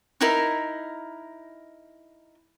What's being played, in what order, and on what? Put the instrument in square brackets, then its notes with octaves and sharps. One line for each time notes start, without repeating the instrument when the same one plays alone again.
[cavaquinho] D#4 E4 A#4